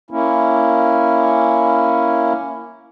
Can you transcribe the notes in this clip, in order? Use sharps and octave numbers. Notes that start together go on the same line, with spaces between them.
A#3 C#4 E4